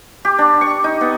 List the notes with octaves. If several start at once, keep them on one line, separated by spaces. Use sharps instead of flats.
G4
D4
C#6
D#4
B3